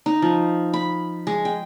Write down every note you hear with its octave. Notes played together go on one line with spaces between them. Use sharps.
D#4
F3
B5
G#3
G5